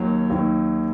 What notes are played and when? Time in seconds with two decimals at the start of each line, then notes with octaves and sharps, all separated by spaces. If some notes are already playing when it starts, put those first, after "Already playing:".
Already playing: D#2 D#3 F#3 A#3
0.30 D#2 D#3 F#3 A#3